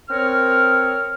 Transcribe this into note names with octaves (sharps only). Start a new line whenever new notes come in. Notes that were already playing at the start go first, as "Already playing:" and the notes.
C4 A#4 C#5 F6